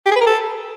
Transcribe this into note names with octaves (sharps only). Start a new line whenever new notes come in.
G4
G#4
B4
A#4
A4